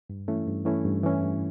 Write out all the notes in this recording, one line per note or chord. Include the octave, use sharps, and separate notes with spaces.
G2
E3 A3 C#4 E4
G2
E3 A3 C#4 E4
G2
E3 A3 C#4 E4
G2